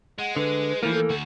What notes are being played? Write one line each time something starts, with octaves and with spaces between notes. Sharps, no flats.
G#3 F#5
D3 B4
E3 F3 A3 A#3 E4
A4
D2 F#4